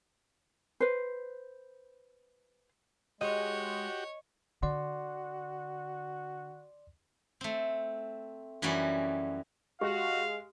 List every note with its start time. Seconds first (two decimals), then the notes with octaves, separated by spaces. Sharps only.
0.80 B4 C5
3.21 G#3 F#4 G4 C#5 D#5
4.63 D3 F#4 D5 C6
7.41 A3 C4
8.62 F#2 E3 G3 C#4 F#4 D5
9.81 G#3 F#4 G4 F5